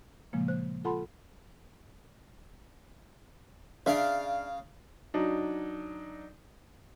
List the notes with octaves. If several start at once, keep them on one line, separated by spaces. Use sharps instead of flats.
A#2 C#3 F3 G#3 A#3
C5 F#6
F4 A4 F#5 A5 B5 C6
C#3 D4 E5 F5
F#3 D4 D#4